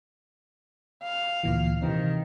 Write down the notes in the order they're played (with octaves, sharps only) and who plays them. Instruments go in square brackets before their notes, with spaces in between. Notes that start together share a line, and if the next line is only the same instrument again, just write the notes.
[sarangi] F5
[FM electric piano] D2 A#2 E3
[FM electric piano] C3 E3 C4 [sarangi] D#3